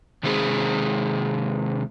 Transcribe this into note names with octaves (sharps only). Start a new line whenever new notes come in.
C3 D#3 G#3 C4 G#4